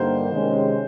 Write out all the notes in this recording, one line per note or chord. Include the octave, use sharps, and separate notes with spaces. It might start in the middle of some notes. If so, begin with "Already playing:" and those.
Already playing: G2 D3 G3 A#3 D#4 C5
C3 D#3 G#3 C#4